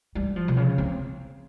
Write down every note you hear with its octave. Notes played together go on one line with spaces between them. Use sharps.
G3
F3
C3
C#3
C4